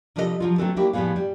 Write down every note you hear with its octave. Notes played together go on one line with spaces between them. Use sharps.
C3 F3 G3 A4 A#4 D#5
F3 F#3 F4
F#3 A3 B3 C4 D4 A4
F#3 G3 A#3 E4 F#4 G4
A2 F3 G3 B3 G#4 F5
G3